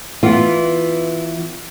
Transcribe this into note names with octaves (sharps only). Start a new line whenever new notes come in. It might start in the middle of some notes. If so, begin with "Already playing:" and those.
E3 B3 F4